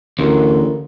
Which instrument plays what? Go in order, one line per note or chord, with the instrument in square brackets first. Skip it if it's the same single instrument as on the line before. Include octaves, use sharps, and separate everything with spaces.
[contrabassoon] A1 [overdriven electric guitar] D2 [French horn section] A#4